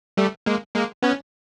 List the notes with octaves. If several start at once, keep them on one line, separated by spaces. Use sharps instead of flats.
G3 A3
G#3 A#3
G#3 A#3
B3 C#4